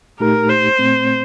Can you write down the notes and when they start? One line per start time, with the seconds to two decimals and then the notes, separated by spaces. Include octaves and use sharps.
0.20 A#2 A3 D#4 G4 A#4
0.50 C5
0.79 A#2 A3 C4